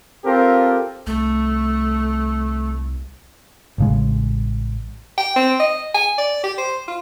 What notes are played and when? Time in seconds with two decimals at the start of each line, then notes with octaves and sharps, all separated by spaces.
0.25 C4 F4 G4 A4 A#4
1.07 C2 A3
3.78 A1 C#3 G#3
5.18 G5
5.36 C4
5.60 D#5
5.94 G#5
6.18 D5
6.43 G4
6.58 C5
6.87 F4